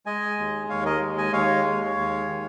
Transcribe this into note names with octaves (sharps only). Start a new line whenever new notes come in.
G#3 D#5 G#5
D#2
D#2 C#5 F5
A#4 D#5
G#3
D#5 G#5
D#2 C#5 F5
G#3
D#2
D#3